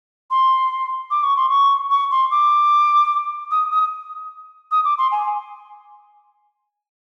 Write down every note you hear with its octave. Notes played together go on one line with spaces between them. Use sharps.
C6
D6
C#6
C6
C#6
C#6
C6
D6
D#6
D#6
D#6
D6
C6
G#5